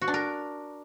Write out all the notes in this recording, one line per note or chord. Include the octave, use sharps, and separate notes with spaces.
F#4
D4
A#4